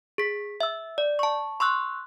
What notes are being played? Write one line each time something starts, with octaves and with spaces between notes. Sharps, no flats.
G#4 B6
E5 E6
D5
A5 C#6
C6 C#6 E6 F#6